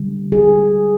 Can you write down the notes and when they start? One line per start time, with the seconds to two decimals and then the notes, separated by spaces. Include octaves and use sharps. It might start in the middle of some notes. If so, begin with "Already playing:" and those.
Already playing: D3 G3
0.32 G#4